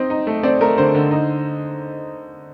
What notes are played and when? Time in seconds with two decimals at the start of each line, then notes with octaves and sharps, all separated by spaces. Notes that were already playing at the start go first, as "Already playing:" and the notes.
Already playing: C4 D#4 D#5
0.10 D#4
0.27 A3
0.43 C4 D5
0.61 A3 A#4
0.78 D3 C5
0.95 D3
1.11 D#4